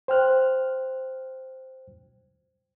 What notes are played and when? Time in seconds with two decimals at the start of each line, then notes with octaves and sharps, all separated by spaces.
0.08 C5 G5 F6 F#6